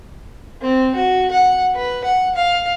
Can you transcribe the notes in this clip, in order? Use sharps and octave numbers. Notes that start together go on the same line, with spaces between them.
C4
F#4
F#5
B4
F#5
F5